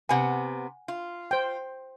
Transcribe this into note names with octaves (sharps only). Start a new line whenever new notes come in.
C3 B3 F#5 G#5
F4
C5 G5